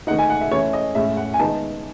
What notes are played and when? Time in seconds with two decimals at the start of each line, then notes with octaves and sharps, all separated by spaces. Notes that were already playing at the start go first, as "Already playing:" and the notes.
0.07 D#3 A3 D#4 F#5
0.18 G#5
0.30 F#5
0.41 E5
0.51 E3 A3 C#4 E4 C#5
0.73 D#5
0.95 A2 G#3 C#4 E5
1.17 F#5
1.34 G#5
1.39 D#3 G#3 B3 D#4 A5